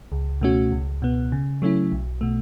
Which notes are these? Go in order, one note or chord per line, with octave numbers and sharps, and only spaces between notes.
C#2
B2 A3 C#4 F#4
C#2
B2 B3
C#3
F#3 A3 C#4 E4
B1
B2 A3